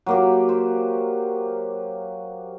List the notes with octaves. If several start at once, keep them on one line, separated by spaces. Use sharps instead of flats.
F#3 A#3 G4
C5